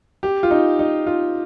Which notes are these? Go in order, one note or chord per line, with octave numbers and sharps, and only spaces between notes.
G4
F4
D#4
D#4
F4